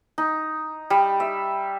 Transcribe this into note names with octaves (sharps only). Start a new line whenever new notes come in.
D#4
G3
E5